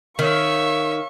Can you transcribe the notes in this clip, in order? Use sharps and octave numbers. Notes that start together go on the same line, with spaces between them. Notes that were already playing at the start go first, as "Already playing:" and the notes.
D#3 C#5 E5 F5 C#6